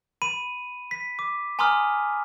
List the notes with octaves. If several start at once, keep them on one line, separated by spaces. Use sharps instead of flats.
B5 D#7
B6
D6
G#5 A#5 C6 D6 D#6 F6